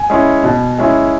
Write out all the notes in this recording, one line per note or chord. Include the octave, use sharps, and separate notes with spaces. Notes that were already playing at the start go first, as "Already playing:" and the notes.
Already playing: G#5
G#3 C#4 E4
B2
G#3 C#4 E4